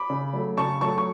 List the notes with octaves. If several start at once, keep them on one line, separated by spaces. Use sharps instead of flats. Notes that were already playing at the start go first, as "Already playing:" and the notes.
Already playing: B5 D6
C#3
F#3 A3
C#3 A5 C#6
F#3 A3 A5 C#6
C#6